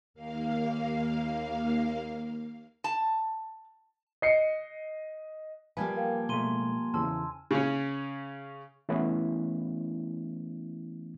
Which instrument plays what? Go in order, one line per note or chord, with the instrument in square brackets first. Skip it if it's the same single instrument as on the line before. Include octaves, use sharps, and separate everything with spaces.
[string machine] D#2 A#3 F5
[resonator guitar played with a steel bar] A5
[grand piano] D#5 C7 C#7
[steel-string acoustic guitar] F3 G3 A#3 [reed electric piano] B4 [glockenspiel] G#5 A5 G#6
[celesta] A#4 F5 G5
[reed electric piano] B2 G#3 A3 [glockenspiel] A#5 C6 D#7 [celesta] G7
[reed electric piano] E2 C#3 E3 [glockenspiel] A5 F6 [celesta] C6 E6
[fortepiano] C#3 C#4
[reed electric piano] E3 A3 B3 C#4 E4